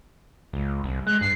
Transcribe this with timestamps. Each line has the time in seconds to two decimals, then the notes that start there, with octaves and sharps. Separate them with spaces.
0.53 C#2
0.84 C2
1.07 G#3 F#6
1.21 G2 C7